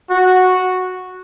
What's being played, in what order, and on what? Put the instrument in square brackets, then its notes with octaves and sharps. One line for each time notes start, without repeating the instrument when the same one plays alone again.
[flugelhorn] F#4